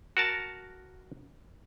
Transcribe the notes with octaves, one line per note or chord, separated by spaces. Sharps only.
F#4 A#4 A5